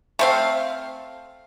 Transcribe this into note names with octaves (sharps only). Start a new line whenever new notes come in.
A3 C4 F5